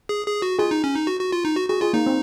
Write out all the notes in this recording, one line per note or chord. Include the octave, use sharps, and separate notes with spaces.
G#4
G#4
F#4
F4 G#4
D#4
C#4
D#4
F#4
F#4
F4
D#4
F#4
F#4 G#4
F4 G#4
A#3 D#4
C4